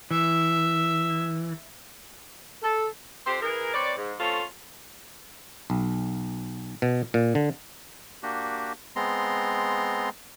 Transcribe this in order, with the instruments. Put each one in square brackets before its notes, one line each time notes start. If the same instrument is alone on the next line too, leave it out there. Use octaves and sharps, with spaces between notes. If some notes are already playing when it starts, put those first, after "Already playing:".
[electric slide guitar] E3 [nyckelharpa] E5
[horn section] A4
[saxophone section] F2 C4 G4 C5
E3 G#4 A#4
C4 B4 C#5 D5
G#2
A3 C4 C#4 F4 A4
[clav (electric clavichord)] B1
B2
A#2
D3
[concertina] A#3 D4 F#4 G4
G#3 B3 C4 A#5 C6